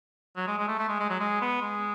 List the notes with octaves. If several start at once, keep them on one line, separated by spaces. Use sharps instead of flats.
F#3
G#3
G#3
A3
A3
G#3
G#3
F#3
G#3
B3
G#3